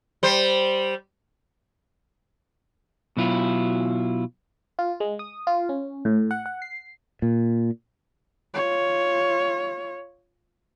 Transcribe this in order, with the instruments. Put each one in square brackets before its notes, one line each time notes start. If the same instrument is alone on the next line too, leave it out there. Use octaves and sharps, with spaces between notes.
[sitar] G3 C5
[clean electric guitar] B2 F#3 E4 F4
[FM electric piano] F4
G#3
D#6
F4
C#4
A2
F#5
F#5
C7
[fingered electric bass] A#2
[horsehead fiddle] F4 C#5